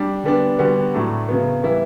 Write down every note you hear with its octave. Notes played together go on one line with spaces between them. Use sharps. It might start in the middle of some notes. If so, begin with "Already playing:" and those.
Already playing: G3 D4
D3 G3 B3 D4
D3 G3 B3 F#4
A2 F#3 A3 D4
C#3 F#3 B3
E3 G3 B3 E4